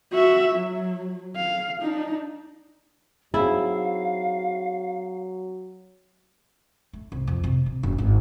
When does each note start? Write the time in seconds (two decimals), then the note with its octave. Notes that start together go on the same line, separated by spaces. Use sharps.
0.12 F#4 E5
0.56 F#3
1.36 F5
1.82 D4 D#4
3.34 F#3 C4 D#4 E4 G#4 F5
6.93 A3
7.12 C2
7.27 F2
7.44 C3
7.66 C3
7.83 F#1
7.98 G#1